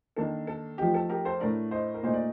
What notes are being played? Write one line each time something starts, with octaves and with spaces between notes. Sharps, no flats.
D#3 A#3 D4 A4
A4
F3 A3 D#4 G4
A4
G4 A#4
A4 C5
A2 A3 D4 A#4 D5
C5 D#5
A#4
A#2 A3 D#4 C5
D5